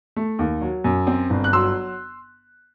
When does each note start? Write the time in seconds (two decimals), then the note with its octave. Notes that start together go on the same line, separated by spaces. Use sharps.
0.16 A3
0.39 D#2
0.61 F#3
0.84 F#2
1.07 C4
1.30 G1
1.44 F#6
1.53 F#3 C6 E6